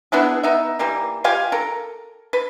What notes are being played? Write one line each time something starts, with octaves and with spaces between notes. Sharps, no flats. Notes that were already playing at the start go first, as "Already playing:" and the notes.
B3 D4 E4 G#4
B3 D#4 E5
E3 G3 A#3
F4 G4 F5 G#5
A4 A#4
B4